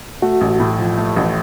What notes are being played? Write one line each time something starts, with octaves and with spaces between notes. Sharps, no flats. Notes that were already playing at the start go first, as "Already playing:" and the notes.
A3 F#4
A1
A2
F3
A3
A1